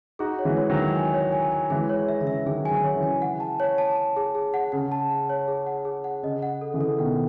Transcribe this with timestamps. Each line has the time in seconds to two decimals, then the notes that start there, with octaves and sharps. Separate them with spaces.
0.19 D#4 F#4 G#4
0.39 C#5
0.45 E3 G#3
0.57 C#5
0.70 D#3 F#3
0.76 C#5
0.95 G#5
1.14 C#5
1.32 G#5
1.51 G#5
1.70 E3 G#3 G#4
1.90 C#5
2.08 E5
2.21 C#3 E3
2.27 E5
2.46 D#3 F#3 G#4
2.66 G#5
2.71 D#3 F#3
2.84 C#5
2.96 C#3 E3
3.03 G#5
3.22 F#5
3.40 A5
3.60 C#5
3.78 A5
3.96 A5
4.16 G#4
4.35 G#4
4.54 F#5
4.72 C#3 F#5
4.92 A5
5.11 F#5
5.30 C#5
5.48 G#4
5.66 F#5
5.85 G#4
6.04 F#5
6.23 C#3 D#5
6.43 F#5
6.61 A4
6.74 C#3 E3
6.81 A4
6.99 B2 D#3 F#5